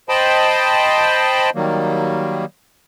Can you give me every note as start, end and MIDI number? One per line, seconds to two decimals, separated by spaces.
0.09 1.50 72
0.09 1.50 75
0.09 1.50 79
0.09 1.50 81
0.09 1.50 83
1.55 2.45 51
1.55 2.45 54
1.55 2.45 55
1.55 2.45 58